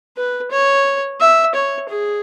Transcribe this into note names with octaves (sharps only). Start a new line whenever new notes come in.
B4
C#5
E5
C#5
G#4